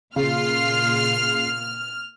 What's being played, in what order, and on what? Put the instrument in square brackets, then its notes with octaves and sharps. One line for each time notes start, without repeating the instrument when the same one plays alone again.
[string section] A#2 F4 C7 [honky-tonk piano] C#3 [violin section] F6